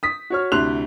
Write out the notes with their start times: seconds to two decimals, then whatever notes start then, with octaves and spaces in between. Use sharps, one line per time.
0.03 D#6 B6
0.30 F#4 C#5 F6
0.52 D2 C3 E4 C6 F#6 F7